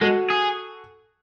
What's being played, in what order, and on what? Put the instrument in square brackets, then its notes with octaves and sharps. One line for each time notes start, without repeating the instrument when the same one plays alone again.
[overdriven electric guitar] G#3 [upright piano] F#4 A4
[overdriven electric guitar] G#4